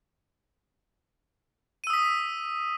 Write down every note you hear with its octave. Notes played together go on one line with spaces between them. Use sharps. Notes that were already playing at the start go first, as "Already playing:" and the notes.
D#6 E6 B6 D#7